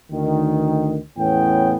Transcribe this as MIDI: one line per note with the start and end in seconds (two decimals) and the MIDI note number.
0.12 0.98 38
0.12 0.98 51
1.17 1.75 40
1.17 1.75 45
1.17 1.75 59
1.17 1.75 61
1.17 1.75 79